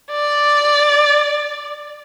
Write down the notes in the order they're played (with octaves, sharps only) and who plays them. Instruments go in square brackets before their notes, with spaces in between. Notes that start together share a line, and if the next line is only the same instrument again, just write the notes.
[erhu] D5